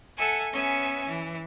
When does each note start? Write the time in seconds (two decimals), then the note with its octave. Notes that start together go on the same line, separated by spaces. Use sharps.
0.19 A4 E5 F#5 G#5
0.53 B3 C#4 E5 G#5
1.08 E3